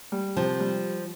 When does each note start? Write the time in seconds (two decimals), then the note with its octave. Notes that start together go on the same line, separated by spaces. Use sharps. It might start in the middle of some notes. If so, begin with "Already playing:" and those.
0.12 G3
0.36 C3 F3
0.60 G3